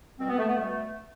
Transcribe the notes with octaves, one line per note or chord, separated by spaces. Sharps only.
B2 G3 C4
B3
A3
B3
B2 G3 A3